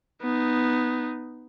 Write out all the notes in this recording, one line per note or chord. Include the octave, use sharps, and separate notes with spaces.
B3 D#4